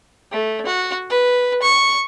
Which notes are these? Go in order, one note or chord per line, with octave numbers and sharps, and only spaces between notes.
A3
F#4
B4
C#6